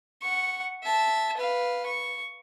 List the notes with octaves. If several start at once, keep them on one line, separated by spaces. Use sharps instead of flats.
F#5 C#6
E5 A5
B4 F5
C#6